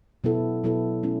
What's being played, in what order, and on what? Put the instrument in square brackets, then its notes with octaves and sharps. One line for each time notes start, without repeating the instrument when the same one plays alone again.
[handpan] B2 F#3 B3 E4 A4
B2 F#3 B3 E4 A4
A3 C#4 E4